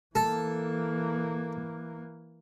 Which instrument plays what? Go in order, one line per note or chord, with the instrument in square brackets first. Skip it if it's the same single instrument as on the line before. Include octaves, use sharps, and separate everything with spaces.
[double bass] E3 A#3 [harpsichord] A4